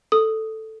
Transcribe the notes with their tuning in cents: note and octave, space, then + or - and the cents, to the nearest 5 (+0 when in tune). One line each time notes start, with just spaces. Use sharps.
A4 +0 D#6 +0